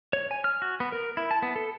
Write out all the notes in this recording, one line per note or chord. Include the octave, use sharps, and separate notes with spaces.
C#5
G#5
F6
F#4
B3
A#4
E4
A5
B3
A4